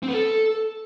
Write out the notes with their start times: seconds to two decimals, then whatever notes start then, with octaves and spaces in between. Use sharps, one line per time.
0.03 C4
0.08 B4
0.14 A4